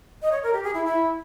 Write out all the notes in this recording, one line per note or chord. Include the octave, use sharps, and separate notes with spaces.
D#5
C#5
A#4
G4
G#4
E4
E4